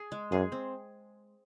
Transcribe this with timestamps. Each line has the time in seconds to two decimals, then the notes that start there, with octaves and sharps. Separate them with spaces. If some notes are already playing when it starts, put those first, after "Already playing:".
Already playing: G#4
0.12 G#3
0.31 F#2 G#4
0.52 C4